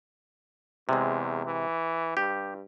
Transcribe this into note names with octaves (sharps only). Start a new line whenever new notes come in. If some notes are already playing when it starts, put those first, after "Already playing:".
E2 C3 G#3
E3
G2 G4